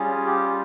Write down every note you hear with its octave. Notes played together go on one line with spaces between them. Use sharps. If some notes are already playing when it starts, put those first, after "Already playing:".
Already playing: G3 C#4 F4 G#4
G4